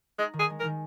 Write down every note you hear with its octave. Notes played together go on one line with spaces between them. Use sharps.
G#3 D#4
D#3
G#4
G#3
A#4
D#3